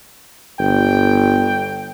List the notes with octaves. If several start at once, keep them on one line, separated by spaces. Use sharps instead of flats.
G1 G5